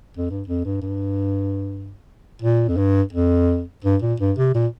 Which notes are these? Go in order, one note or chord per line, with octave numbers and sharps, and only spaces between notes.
F2
G2
F2
G2
G2
A#2
F2
G2
F2
G2
A#2
G2
C3
A#2